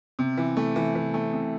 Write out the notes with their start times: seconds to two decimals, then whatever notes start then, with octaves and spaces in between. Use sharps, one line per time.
0.19 C3
0.37 E3
0.57 A3
0.76 E3
0.95 E3
1.14 A3
1.33 C3